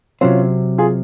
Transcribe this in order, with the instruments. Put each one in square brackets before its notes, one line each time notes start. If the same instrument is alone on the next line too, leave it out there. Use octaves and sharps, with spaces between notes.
[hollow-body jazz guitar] C3 F#3 C4 [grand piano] C#4 F4
[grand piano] F4 G#4